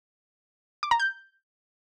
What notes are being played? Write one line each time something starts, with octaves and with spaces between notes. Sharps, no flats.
D6
A#5
G6